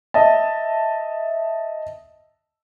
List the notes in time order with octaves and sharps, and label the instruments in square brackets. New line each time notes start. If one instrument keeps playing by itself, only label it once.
[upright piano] D#5 E5 A5